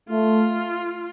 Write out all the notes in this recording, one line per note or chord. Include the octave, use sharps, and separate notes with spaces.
A3 F4